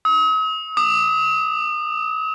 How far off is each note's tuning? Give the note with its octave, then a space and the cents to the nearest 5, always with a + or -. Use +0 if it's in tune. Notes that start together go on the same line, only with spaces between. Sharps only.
D#6 +45
D#6 -35